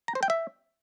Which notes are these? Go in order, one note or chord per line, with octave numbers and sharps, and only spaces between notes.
A#5
C5
G5
E5